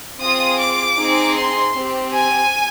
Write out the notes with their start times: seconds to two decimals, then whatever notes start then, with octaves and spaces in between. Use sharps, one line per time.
0.20 C4 F4 G#4 D#6
0.59 D6
0.98 C4 D#4 G#4
1.36 C6
1.75 C4 G4
2.13 G#5